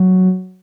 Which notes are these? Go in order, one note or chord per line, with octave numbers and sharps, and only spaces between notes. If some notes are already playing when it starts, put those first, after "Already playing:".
Already playing: F#3